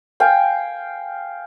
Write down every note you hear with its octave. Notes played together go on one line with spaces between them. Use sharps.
F5 G5 G#5